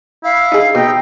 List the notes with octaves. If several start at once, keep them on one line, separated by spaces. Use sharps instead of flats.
E4 F5
D#4 G#4
B2 D#4 G5